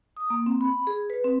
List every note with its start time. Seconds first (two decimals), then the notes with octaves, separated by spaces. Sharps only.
0.17 D#6
0.30 A#3
0.46 C4
0.61 B5
0.87 G#4
1.10 B4
1.24 C4